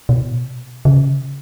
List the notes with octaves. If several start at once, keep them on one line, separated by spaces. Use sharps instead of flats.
B2
C#3